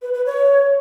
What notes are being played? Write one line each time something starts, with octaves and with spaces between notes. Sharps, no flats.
B4
B4
C#5